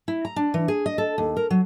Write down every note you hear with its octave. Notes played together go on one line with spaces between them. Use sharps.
E4
A#5
D4
E3
G#4
D#5
A4
D#2
A#4
F#3